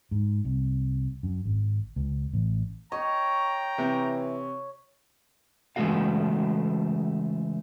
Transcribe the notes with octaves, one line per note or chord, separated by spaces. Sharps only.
G#2
C2
F#2
G#1
C#2
A1
C#5 D#5 G5 A#5
C3 E3
C#3 E3 G#3 A3 F#4 F5